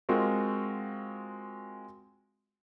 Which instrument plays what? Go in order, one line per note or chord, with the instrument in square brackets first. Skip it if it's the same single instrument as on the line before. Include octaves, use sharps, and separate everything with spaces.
[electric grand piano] G#3 C4 F4 F#4 A#4